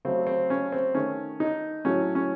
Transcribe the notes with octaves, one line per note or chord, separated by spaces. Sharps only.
C#3 F#3 A3 C4
C4
C#4
C4
D#3 A3 C#4
D#4
A2 F#3 A3 C#4
C#4